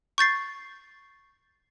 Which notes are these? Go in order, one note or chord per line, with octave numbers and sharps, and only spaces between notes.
C#6 G6 A6 C7